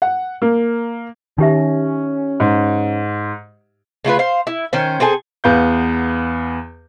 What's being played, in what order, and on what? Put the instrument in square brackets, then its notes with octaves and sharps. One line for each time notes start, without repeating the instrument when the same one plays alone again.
[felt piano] F#5
A#3
[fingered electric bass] D#3 [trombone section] C#4 [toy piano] D#4 G4 E5
[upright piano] G#2
[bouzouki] C#3 A3 F4 B4
C5 F5
E4
D#3 C#4 C5
C4 G#4 A4 G#5
[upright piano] E2 B3 F5 G6